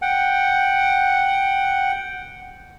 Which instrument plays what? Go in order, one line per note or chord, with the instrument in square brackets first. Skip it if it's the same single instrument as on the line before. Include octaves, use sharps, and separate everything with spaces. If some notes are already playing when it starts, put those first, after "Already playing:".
[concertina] F#5 G5